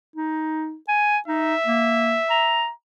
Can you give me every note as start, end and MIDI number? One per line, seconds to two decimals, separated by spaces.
0.16 0.76 63
0.88 1.18 80
1.28 1.55 63
1.28 2.72 76
1.66 2.17 58
2.30 2.70 82